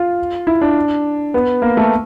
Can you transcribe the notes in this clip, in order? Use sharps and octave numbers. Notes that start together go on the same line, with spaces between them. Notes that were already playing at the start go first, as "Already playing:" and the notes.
Already playing: F4
E4
D4
B3
A#3
A3